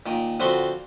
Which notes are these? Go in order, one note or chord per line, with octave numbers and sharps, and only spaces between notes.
A#2 D#3
D3 F3 C4 F#4 B5 C6